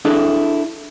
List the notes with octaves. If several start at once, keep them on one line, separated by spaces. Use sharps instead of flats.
D4 E4 G#4 A4